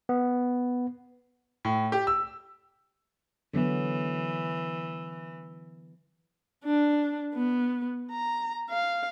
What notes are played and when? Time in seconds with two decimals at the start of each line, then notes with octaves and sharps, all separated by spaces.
0.09 B3
1.65 A2
1.92 G4
2.07 E6
3.54 D3 E3 F#3 B3
6.65 D4
7.35 B3
8.11 A#5
8.70 F5